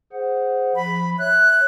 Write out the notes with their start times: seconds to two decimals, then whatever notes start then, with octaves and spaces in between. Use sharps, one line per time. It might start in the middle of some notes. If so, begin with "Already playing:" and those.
0.12 G#4 C5 F#5
0.76 F3 B5
1.19 C#5 E5 F#6